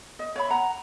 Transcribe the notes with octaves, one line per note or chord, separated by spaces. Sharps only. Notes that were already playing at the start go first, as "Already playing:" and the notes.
D#5
C#5 E5 B5
F#5 A#5